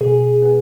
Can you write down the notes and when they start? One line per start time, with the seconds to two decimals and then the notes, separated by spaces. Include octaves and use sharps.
0.01 B2 G#4
0.42 G#3 B3